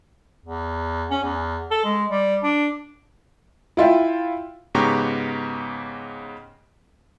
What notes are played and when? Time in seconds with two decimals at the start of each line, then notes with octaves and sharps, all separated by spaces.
0.44 E2
1.10 C#4
1.23 E2
1.71 A4
1.84 G#3
2.09 G3
2.43 D4
3.77 E4 F4 E5 G5
4.75 G#2 C#3 B3 G4 A#5 C#6